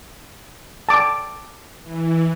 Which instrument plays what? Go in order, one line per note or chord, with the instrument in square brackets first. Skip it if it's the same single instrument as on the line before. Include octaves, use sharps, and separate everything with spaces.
[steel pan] A5 D6
[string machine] E3